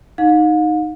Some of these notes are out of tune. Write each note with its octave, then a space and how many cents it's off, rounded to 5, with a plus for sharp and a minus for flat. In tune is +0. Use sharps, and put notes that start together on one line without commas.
D#4 +0 F5 +45